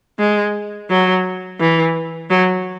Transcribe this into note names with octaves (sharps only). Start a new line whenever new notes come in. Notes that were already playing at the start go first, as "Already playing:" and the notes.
G#3
F#3
E3
F#3